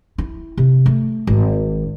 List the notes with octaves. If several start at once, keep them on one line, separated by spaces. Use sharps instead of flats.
E4
C3
A3
G#1